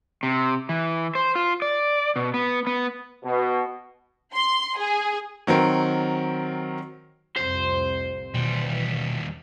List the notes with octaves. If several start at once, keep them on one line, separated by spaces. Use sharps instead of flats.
C3
E3
C5
F4
D5
B2
B3
B3
B2
C6
G#4
D#3 F#3 C4 A#4
C2 F2 A2 C5
D#2 B2 E3 G3